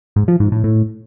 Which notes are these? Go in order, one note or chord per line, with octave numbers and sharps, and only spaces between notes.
G#2
F3
G#2
A2
A2